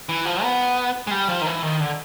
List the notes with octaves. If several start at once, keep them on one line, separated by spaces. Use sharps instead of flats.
E3
F3
B3
G#3
G3
F3
D#3
E3
D#3
D3